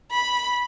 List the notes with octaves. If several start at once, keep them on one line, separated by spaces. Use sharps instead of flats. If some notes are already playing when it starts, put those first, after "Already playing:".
B5